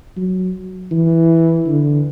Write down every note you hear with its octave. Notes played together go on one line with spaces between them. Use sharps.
F#3
E3
D3